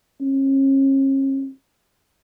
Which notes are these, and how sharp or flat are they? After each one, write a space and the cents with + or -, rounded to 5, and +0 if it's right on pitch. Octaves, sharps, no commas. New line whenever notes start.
C#4 -40